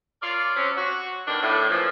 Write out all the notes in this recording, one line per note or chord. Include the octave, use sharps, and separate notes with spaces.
F4 A#4 C#5 D5
F#3 C4 C#4
F#4
B2 D#3 D4
A2
A#2 E3 F3